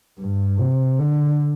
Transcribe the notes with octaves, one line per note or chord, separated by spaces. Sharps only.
G2
C3
D3